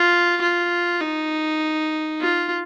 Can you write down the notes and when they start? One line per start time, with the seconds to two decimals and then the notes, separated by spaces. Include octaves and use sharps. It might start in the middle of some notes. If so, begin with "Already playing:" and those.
Already playing: F4
0.41 F4
1.01 D#4
2.21 F4